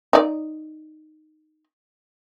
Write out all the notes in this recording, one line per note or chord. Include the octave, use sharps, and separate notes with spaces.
D#4 D5